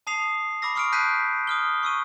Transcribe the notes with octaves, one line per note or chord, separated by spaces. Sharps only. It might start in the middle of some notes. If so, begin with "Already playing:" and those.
A5 D#6 C7 F7
B5 D6 E6 A#6 C7
C#6 D#6 F6 C#7 D7
A5 F#6 G6 B6 C7 D#7
D#6 F6 G7
C#6 E6 D#7